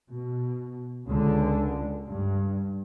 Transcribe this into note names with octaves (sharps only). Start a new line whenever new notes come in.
B2
C#2 D3
G2